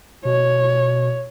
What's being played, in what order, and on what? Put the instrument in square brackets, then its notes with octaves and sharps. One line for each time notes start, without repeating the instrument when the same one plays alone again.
[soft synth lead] B2 [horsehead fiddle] C#5